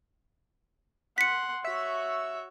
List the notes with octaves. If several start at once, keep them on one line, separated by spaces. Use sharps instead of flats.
F#5 C6 B6 C#7
F#4 C#5 E5